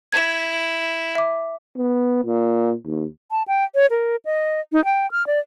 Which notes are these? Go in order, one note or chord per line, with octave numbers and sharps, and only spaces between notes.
E4 G#6 E7
E5 D6
B3
A#2
D#2
A5
G5
C#5
A#4
D#5
D#4
G5
F6
D5